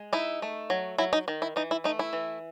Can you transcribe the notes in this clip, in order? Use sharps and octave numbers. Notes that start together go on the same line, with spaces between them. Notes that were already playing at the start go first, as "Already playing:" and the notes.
Already playing: G#3
D#4 E4
A3
F#3
F#3 E4
D#4
D#3
E4
E3 D#4
E4
A3 D#4
E4
E3